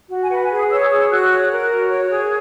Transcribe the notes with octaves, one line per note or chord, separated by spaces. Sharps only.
F#4
G#5
B4 F#5
G#5
G#4
D#6
C#5 E6
D#6
G#4 D#6
E6
F#4 F#6
C#5
A#4
F#4
C#5
G#4